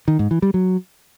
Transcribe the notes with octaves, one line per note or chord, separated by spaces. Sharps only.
D#3
G#2
E3
G3
F#3